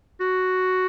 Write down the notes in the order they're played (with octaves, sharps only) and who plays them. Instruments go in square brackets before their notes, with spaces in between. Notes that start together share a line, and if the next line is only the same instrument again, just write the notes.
[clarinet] F#4